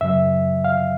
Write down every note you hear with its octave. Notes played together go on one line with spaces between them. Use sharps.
F#2 C#3 F#3 E5
F5